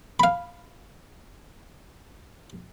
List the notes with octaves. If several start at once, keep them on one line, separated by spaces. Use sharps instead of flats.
F5 B5